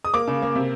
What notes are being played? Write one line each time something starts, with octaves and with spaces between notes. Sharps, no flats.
D#6
A#3 D6
C#3
A#3
C3